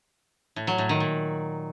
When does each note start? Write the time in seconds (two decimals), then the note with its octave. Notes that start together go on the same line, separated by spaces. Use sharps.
0.56 A2
0.67 F#3
0.78 A2
0.89 D#3
1.00 A#2